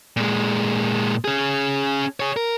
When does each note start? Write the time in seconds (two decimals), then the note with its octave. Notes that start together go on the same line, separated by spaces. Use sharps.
0.17 A#2 G#3
1.25 C#4 G#4
2.20 G#4 C#5
2.36 A#4